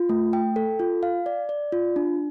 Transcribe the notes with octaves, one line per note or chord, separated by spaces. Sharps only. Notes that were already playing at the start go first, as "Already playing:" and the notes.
Already playing: F4
A3
G5
A4
F4
F5
D5
D5
F4
D4